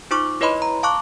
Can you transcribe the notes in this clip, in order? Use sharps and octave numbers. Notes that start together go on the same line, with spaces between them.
D#4 F4 C5 C#6 D6
E4 B4 C#5 D#5 B5 C6
A#5
F5 A5 C#6 D6 F#6